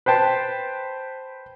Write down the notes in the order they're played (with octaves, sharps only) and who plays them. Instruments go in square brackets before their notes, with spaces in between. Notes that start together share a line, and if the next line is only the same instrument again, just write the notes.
[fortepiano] B4 C5 G5 A5